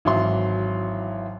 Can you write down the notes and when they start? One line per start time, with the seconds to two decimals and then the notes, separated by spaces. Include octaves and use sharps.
0.05 G#1 E3 F#3 E4 C6